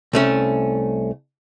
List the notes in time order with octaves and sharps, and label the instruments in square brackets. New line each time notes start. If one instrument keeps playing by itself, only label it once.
[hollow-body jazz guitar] C2 A3 C#4